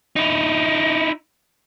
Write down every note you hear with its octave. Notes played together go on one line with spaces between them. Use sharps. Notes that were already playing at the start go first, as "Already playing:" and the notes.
D#4 E4